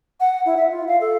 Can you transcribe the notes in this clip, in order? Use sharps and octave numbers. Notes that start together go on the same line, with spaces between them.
F#5
E4
E5
F4
F5
A4